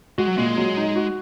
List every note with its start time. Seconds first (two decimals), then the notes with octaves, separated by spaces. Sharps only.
0.18 G#3 F#4
0.27 F#3
0.36 A#2 G#3
0.57 F#3
0.77 D#4
0.96 F#4